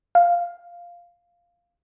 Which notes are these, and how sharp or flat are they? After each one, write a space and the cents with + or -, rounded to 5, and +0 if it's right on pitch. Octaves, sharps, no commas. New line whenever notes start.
F5 +0